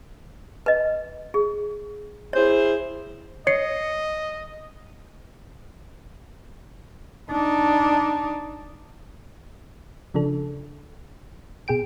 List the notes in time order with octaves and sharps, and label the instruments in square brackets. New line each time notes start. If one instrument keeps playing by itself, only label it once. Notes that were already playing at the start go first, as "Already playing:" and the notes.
[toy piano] B4 D#5
G#4
[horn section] E4 G#4 C5 [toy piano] C#5
[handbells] C#5 C7 C#7 [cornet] D#5
[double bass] D4 D#4
[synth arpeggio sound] C#3 F3 D4 A4
B2 G#4 G5 D7